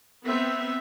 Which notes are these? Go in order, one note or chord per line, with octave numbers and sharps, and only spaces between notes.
B3 C4 E5